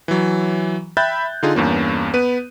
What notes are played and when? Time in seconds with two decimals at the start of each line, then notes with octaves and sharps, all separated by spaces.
0.08 E3 F#3
0.97 E5 G5 B5 F#6 G6 A6
1.43 D3 D#4 F4 G#4
1.55 E2 G2 A#3 C#4
2.14 B3 B4 D#7